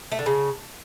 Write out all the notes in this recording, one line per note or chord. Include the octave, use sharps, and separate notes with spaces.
A3
D3
C#3